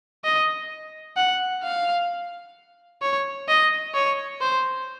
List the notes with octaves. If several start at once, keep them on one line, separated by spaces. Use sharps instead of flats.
D#5
F#5
F5
C#5
D#5
C#5
C5